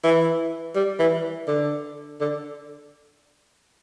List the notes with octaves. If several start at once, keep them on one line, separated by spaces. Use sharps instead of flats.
E3
G3
E3
D3
D3